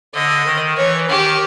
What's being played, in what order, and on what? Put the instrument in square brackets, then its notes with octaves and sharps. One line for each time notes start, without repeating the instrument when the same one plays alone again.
[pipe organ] D3 [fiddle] D#5
[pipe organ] D#3
[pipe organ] E3 [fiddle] C#5
[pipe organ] D#3 [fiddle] G4